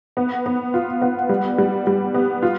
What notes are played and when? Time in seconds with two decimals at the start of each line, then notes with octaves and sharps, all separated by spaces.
0.17 B3
0.46 B3
0.74 F4
1.02 B3
1.29 G3
1.58 G3
1.87 G3
2.14 B3
2.43 F4